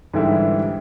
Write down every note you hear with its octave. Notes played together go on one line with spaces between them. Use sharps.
G#2 D3 E3 G3 E4